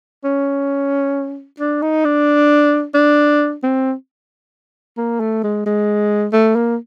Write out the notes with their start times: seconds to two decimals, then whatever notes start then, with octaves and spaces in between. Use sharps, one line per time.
0.24 C#4
1.59 D4
1.82 D#4
2.05 D4
2.94 D4
3.63 C4
4.97 A#3
5.20 A3
5.43 G#3
5.66 G#3
6.33 A3
6.56 A#3